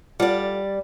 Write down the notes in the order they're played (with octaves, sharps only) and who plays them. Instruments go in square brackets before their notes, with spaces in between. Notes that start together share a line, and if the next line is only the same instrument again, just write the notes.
[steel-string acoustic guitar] G3 D5 [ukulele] F4 A4 F#5